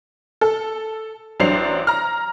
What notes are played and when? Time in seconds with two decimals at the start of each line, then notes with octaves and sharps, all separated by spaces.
0.41 A4
1.40 A1 F#3 D4 C5 C7 F7
1.87 A#5 F6